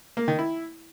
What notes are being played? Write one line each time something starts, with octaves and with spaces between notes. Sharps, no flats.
A#3
D#3
E4